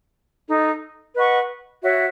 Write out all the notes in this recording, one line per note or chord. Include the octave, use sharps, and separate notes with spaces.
D#4 A4 D#5
B4 D#5 F#5 C#6
F#4 C#5 E5